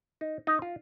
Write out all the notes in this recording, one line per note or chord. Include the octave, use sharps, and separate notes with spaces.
D#4
D#4
F4